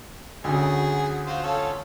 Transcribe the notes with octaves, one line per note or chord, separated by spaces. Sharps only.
D2 C#3 F#4 G#4
F4 F#4 C5
C#4 F4 A4